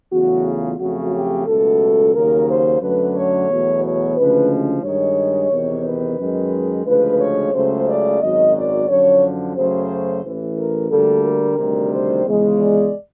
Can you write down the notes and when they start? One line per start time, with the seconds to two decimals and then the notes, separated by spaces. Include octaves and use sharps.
0.11 E2 C#3 F#3 A3 F#4
0.45 F4
0.79 F2 C#3 F#3 A3 F#4
1.13 G4
1.46 C#2 B2 F#3 A3 A4
2.14 D#2 C#3 F#3 A#3 A#4
2.48 C5
2.81 F#2 D3 F#3 A3 B4
3.15 C#5
3.49 E2 B2 F#3 A3
3.83 C#5
4.16 D2 C#3 F3 G#3 B4
4.83 G2 D#3 G#3 C#5
5.51 E2 C3 D#3
5.85 B4
6.18 F#2 D#3 G#3
6.86 D2 C#3 F3 G#3 B4
7.19 C#5
7.53 C#2 C#3 F#3 A3 C5
7.87 D5
8.21 G#1 F#2 D#3 F#3 D#5
8.54 D5
8.88 F#2 D3 F3 C#5
9.56 F#2 C#3 F#3 A3 C5
10.24 A1 A2 E3
10.57 A#4
10.90 D2 D3 G3 A#3 A4
11.24 A#4
11.58 D2 C3 D#3 G3
11.92 C5
12.25 E2 C#3 F3 G#3
12.59 D5